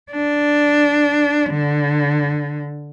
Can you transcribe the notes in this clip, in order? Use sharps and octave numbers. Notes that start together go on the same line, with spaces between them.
D4
D3